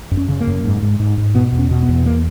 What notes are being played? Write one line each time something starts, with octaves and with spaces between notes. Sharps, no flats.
F#2
C#4
C#3
A#3
F#2
G#2
G#2
G#2
G#2
B2 B3
E2
C#4
B2
B3
E2
A#3